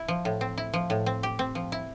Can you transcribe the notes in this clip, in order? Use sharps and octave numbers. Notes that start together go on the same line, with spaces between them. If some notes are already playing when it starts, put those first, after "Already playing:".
Already playing: E4
F3
A2
C4
E4
F3
A2
C4
G4
C4
F3
E4